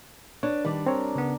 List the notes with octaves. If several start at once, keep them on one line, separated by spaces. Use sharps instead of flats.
D4 B4 C#5
D#3 G3 D4 D5 B5
C4 A#4 C#5
C#3 B3